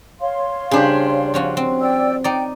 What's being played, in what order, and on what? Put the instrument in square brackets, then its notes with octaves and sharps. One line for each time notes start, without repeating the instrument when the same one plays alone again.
[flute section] C#5 F5 C6
[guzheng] C#3 C5 [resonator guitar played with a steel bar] G3 D4 G#4
[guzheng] F3 C#4 F#4
C4
[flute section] D5 G5 E6
[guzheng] D#4 D5 [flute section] G5